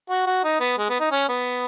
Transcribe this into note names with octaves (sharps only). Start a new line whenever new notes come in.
F#4
F#4
D#4
B3
G#3
B3
D#4
C#4
B3